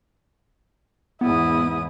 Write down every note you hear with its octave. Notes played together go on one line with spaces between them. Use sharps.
E2 G#2 B3 E4 D#6